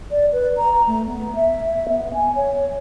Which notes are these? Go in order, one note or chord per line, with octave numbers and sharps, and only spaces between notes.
D5
B4
A#5
A3
B3
E5
B3
G#5
C#5